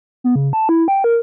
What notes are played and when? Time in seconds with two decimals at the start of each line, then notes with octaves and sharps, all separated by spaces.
0.24 B3
0.36 C#3
0.53 A5
0.69 E4
0.88 G5
1.04 A#4